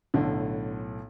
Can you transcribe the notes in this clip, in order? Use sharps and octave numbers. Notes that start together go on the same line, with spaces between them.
B1 A2 D3